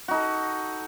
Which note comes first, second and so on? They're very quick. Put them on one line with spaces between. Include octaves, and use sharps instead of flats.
F#4 D#4 A4